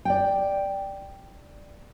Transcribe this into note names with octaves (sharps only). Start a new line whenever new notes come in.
D5 G5